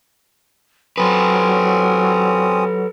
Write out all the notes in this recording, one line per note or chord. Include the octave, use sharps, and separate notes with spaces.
F#3 C4 C#4 A4 B4 D#6